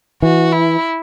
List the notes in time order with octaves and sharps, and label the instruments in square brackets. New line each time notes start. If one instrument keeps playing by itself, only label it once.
[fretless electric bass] E3 [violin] F#4
[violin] E4